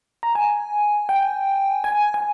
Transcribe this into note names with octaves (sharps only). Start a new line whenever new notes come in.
A#5
G#5
G5
G#5
G#5